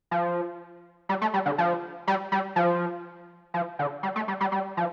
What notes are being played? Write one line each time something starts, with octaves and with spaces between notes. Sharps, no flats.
F3
G3
A3
G3
D3
F3
G3
G3
F3
F3
D3
G3
A3
G3
G3
G3
F3